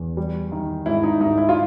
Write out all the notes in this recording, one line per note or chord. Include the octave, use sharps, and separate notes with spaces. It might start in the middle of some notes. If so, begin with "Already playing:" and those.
Already playing: E2
G3
D#3
G#2 E4
D#4
G#2 D#4
E4
F4